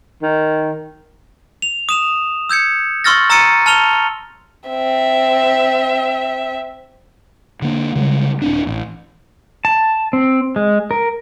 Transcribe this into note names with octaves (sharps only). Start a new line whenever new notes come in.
D#3
F7
D#6 E7 F7
E6 G6 G#6 C#7
C6 C#6 E6 F6 A6 A#6
A#5 E6 A6 C#7 D#7
A5 F6 F7 G7
C4 E5
D3 A#3
C#3 G3 G#3
D#1 C4 D4
A1
A5
C4
G#3
A#4